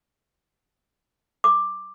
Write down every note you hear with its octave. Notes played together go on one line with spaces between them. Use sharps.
D6